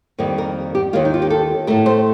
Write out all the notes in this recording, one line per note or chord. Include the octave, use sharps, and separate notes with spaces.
F2 D#3 G3 A#3
A#4
G4
D#2 D#3 A#3 F4
D#4
F4
G4
A4
A2 A3 A#4
C5